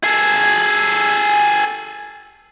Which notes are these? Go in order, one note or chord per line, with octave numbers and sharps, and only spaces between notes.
G#4 A4